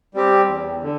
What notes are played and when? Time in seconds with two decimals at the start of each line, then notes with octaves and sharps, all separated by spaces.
0.14 G3 C4 G4
0.48 E2
0.83 D3